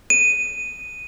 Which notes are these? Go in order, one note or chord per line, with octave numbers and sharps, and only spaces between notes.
D#7